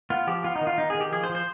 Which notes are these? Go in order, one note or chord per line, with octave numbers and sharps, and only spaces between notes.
B3 F4
F3 G4
B3 F4
D#4
D#3
F4
B3 D#4
D#3 G#4
G4
F3 G#4
C5
F3
C5